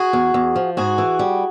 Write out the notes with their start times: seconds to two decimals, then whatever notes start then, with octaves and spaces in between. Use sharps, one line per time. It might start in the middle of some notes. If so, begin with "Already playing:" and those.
Already playing: F#4 G#4
0.13 E2
0.34 E2
0.56 F3
0.77 G#2 F#4 G#4
0.98 E3
1.19 G3